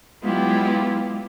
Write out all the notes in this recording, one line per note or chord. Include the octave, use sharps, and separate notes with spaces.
F#3 G#3 B3 E4 F4 G4